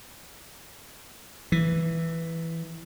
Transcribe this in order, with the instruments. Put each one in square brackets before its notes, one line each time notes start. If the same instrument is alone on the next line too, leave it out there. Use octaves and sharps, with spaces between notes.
[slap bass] E3